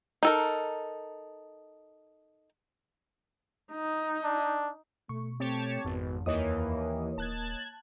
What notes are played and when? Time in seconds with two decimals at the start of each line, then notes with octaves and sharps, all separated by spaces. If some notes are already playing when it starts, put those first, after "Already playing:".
0.23 D#4 A4 A#4
3.73 D#4
4.24 D4
5.09 B2 A3 C#6
5.40 A3 C4 G4 C#5 A5
5.85 G#1 F2 B2
6.26 D#2 E3 A#3 C#5 D#5 D#6
7.18 D#1 A5 F#6 G#6